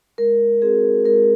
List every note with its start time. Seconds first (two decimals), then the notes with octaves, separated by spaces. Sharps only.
0.18 G#3 A#4
0.62 C4 F#4 G#4
1.05 G#3 A#4